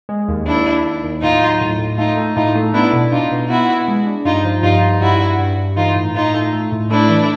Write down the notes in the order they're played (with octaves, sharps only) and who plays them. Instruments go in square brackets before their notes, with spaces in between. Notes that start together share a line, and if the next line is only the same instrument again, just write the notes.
[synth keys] G#3
D#2
[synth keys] D#2 [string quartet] D4 E4
[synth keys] D#2
D#2
D#2
[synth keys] A2 [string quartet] D#4 F4
[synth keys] F#3
A2
A2
[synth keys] A3 [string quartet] D#4 F4
[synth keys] A3
[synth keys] A2 [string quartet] D#4 F4
[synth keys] A3
[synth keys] B3 [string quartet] D4 E4
[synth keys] B2
[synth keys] D4 [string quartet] D#4 F4
[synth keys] B2
[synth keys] B3 [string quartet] E4 F#4
[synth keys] B3
G#3
D4
[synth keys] G2 [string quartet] D#4 F4
[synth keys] F3
[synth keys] G2 [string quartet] D#4 F4
[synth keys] G2
[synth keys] G2 [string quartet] E4 F#4
[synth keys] G2
G2
G2
[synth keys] E3 [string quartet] D#4 F4
[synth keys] A2
[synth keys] A2 [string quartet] D#4 F4
[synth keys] A3
A3
A2
[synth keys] A3 [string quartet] D4 E4
[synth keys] E3